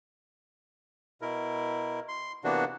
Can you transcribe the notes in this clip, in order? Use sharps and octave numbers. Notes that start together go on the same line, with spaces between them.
B2 E4 A#4
C6
C3 E3 A#3 B3 D4 F#4